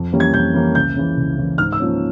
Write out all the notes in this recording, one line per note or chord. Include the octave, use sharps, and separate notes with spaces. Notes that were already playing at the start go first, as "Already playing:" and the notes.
Already playing: F2
E3 G3 A#3 C#4
G#6
F2 G6
E3 G3 A#3 C#4
C#2 G6
C#3 E3
C#2
C#3 E3
G#2 F6
E6
F3 A#3 C#4